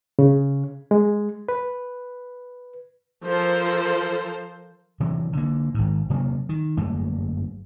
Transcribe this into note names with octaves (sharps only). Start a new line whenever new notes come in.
C#3
G#3
B4
F3 A4 A#4 C5
C3 E3 F#3
D3 A#3
G#1 G#2
C3 F#3 A#3 C4
D#3
G1 F#2 A3 A#3